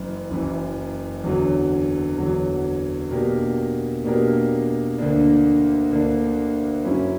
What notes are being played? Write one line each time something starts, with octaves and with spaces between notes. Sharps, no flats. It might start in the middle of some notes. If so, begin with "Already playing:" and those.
Already playing: F#1 F#2 E3
F#1 F#2 E3
E2 D3 F#3
E2 D3 F#3
B2 A#3 D4 G4 A#4
B2 A#3 D4 G4 A#4
D2 D3 A#3 D4
D2 D3 A#3 D4
F#2 C#3 F#3 C#4 E4